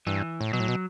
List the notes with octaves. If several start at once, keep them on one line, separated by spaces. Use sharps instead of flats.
G2 E3
A2
B2 F#3
A2
B2